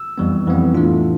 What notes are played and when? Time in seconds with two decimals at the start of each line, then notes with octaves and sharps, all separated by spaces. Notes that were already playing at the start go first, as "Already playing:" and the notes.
Already playing: E6
0.18 F2 E3 G3 B3
0.47 F2 E3 G3 B3
0.75 A2 E3 A3 D4 F4